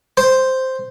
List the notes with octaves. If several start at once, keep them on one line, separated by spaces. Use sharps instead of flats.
C5